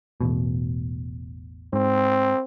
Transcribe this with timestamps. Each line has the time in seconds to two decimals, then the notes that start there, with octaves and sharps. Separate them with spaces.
0.21 E1 A1 B2
1.73 G#2 C4